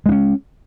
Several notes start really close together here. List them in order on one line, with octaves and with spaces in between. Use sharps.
G#3 D4 C#4